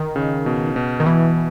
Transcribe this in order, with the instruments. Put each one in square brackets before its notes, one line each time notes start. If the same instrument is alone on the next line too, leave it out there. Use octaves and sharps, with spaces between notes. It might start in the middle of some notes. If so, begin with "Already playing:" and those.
Already playing: [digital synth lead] D#3
[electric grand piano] C#3
B2
B2
[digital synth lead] D#3
[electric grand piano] B2 [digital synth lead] E3